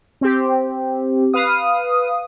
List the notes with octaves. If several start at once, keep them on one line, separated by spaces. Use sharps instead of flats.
C4 G4
B4 F5 D#6